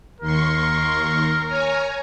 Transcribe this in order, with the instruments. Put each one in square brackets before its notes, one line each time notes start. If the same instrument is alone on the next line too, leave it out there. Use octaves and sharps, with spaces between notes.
[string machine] D#2 C6 C#6 [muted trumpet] A#4
[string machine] C#5 G#5 A#5